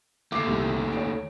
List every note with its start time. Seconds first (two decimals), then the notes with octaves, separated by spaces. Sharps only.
0.32 D#2 A3 D6 C7
0.47 C2
0.93 C#5 D7